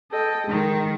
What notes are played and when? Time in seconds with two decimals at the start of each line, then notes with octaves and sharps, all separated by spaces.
0.11 A4 D#5 G5
0.49 D#3 G#3